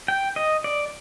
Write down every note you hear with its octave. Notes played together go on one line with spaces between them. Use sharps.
G5
D#5
D5